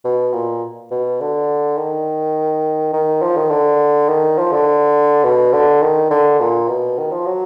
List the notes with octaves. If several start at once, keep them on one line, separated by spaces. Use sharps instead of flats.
B2
A#2
B2
D3
D#3
D#3
F3
D#3
D3
D#3
F3
D3
B2
D3
D#3
D3
A#2
B2
D#3
F3
F#3